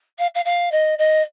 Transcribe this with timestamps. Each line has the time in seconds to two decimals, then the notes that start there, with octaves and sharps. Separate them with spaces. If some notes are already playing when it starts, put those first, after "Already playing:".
0.18 F5
0.35 F5
0.45 F5
0.72 D#5
0.98 D#5